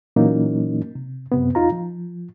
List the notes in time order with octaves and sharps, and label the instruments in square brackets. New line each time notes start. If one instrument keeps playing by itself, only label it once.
[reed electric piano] A#2 E3 F#3 A#3 C#4 D#4
C3
F#2 C3 B3
E2 D#4 F4 A#5
F3